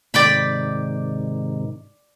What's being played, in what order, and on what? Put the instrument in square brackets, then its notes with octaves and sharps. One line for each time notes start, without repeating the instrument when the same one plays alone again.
[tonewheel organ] G#2 C3 D#3 [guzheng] D5 G5 B5